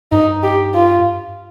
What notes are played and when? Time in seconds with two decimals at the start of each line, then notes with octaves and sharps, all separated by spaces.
0.12 G2 D#4
0.43 G4
0.74 F4